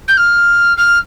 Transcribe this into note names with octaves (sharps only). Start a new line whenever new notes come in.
G6
F6
F6